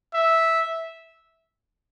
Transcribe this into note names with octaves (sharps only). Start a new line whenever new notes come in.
E5